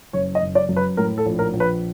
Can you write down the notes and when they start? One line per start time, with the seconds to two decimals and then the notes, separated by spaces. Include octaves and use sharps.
0.13 F#1 C#5
0.35 D#5
0.42 F#1
0.55 D5
0.69 F#2
0.76 B4
0.97 A2 A#4
1.18 A4
1.26 A#1
1.39 A#4
1.53 A#1
1.60 B4